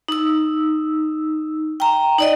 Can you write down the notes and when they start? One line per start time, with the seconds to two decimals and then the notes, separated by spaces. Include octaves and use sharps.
0.08 D#4 E6
1.80 G5 A#5
2.19 D#4 D5 D#5